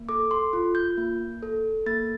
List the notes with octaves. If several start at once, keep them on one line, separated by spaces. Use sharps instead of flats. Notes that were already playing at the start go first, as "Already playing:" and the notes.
Already playing: A#3
A4 D6
C6
F4
G6
A#3
A4
A#3 A6